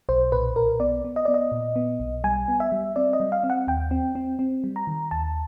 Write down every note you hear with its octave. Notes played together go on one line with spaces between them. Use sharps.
B1 C5
A#2 B4
B1 A#4
B3 D5
B3
D#5
B3 D5
D#5
A#2
B3
B1
G3 G#5
B3
E5
G3
C4 D5
D#5
G3
F5
C4
F#5
D#2 G5
C4
C4
C4
G3
A#5
D#3
D#2 A5